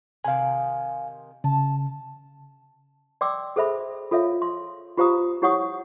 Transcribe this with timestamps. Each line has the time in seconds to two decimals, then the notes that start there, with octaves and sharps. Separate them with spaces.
0.24 C3 D#3 F5 G#5
1.44 C#3 A5
3.21 D5 G5 C6 D6 E6
3.56 G#4 A4 C5 E5 B5
4.11 F4 A4 C#5 E5 F5
4.42 C6
4.97 F4 G4 C5 F5 A#5 D#6
5.42 E4 G4 C#5 F#5 C#6 D#6